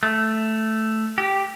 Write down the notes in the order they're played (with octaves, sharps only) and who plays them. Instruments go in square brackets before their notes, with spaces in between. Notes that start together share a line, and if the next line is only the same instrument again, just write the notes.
[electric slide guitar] A3
G4